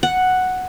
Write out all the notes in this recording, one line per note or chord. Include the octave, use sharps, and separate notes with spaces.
F#5